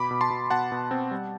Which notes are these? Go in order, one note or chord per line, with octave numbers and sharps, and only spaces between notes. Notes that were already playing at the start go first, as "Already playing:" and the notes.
Already playing: B2 B5 D6
B2
A5 C6
B2
B2 F#5 A5
B2
C4
G3